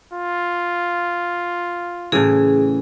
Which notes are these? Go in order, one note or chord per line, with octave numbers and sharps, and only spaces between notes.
F4
A2 C#3 E3 G#4